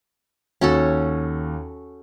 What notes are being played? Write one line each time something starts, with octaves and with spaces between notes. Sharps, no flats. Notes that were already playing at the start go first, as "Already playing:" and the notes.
D#2 C#4 F#4 A4